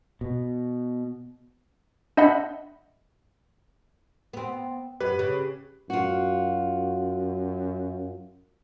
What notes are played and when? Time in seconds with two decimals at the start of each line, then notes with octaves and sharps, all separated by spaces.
0.21 B2
2.17 D4 D#5 E5 F#5 B5
4.33 B3 C4
5.00 F#2 G4 B4
5.19 C#3
5.90 F#2 F4 F#4